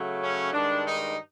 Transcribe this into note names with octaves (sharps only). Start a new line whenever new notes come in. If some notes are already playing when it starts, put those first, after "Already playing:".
Already playing: C#3 F#3 A3
C#4
G2 D#3 G#3 D4
D#4